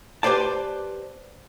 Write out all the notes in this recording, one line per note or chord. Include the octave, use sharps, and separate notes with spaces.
G4 B4 C5 D5 A5